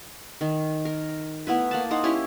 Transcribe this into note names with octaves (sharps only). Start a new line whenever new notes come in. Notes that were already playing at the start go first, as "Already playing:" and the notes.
D#3
A#4
A3 B3 E4 B4
A#3 F#5 A5
D#4 C5 F#5
C#4 E4 G4